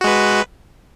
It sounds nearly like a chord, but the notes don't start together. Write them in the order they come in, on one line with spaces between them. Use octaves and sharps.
F#4 G#3 B4